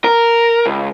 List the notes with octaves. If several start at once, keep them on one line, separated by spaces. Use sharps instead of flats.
A#4
C#2